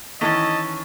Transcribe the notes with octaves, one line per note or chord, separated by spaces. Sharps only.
D#3 E3 A3 C#4 E4 D#5 A5